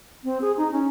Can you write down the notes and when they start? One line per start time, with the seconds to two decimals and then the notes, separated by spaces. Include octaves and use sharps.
0.24 C4
0.42 G#4
0.57 D#4
0.72 C#4